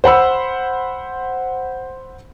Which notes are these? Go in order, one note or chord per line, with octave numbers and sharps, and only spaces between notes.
C5 F#5 B5 E6